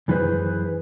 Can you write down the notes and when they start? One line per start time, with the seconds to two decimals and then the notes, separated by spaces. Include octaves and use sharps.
0.08 F#2 E3 D4 G#4 B4 C5